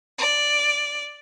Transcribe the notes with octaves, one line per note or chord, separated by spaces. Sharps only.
D5